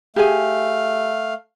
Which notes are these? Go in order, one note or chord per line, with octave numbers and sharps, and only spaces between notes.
A3 G4 G#4 F5 G#5